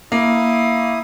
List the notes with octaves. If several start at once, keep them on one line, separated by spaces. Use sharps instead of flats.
A#3 E4 D#6